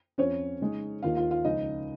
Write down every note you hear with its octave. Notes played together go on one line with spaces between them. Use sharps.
F2 F3 C#4 C#5
C#3 G#3 D#4
D#2 D#3 A#3 F4 F5
F4 F5
F4 F5
C#2 C#3 F3 D#4 D#5